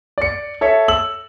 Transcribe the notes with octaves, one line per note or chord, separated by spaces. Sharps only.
D5 C#7
A4 C#5 E5
E6 F#7